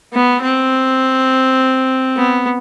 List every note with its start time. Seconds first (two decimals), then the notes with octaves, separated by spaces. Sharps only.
0.13 B3
0.42 C4
2.16 B3